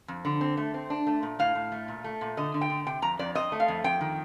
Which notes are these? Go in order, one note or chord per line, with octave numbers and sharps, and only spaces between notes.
F2
D3
C4
A3
C4
D4
A3
A#2
A2 F5
A2
A3
A#2
A3
A#2
D3 D#5
D3
G5
D3
C3 G5
F2 A#5
F2 D5
C4 D#5
A3
F5
F2
F2 G5
D#3